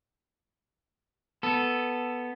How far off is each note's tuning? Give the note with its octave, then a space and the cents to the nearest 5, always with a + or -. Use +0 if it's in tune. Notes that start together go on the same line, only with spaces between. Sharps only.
B3 +0 A4 +0